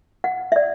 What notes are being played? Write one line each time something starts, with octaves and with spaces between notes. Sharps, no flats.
F#5
E5
D5